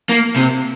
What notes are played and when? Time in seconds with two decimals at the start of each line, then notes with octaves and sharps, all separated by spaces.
0.09 A#3
0.36 C3